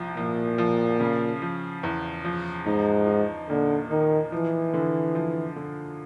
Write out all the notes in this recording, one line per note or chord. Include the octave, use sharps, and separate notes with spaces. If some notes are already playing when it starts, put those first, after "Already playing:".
Already playing: C2 F3
A#2 F3
F3
C#3
F3
E2
F3
G#2 D#4
D#4
A#2 D3
D#3 D#4
E3 F3
D3
F3
D3